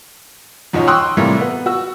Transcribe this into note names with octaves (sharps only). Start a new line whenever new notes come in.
E2 G#2 B2 F3 C#4 D#4
G5 C6 C#6 D#6 E6 F#6
A2 C3 E3 G3 A3 A#3
B3
F#4 E6